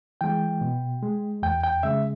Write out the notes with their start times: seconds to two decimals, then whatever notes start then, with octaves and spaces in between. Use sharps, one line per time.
0.21 E3 G#3 G5
0.61 B2
1.03 G#3
1.43 E2 G5
1.63 G5
1.83 C#3 G#3 E5